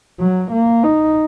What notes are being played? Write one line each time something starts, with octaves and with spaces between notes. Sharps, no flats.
F#3
A#3
D#4